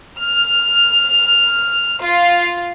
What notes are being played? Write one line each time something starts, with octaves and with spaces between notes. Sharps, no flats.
F6
F4